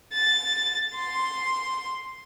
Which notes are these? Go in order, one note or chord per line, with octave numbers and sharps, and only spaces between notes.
A6
C6